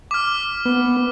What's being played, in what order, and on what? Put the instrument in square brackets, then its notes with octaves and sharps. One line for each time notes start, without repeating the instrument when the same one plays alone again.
[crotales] D6 F6
[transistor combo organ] B3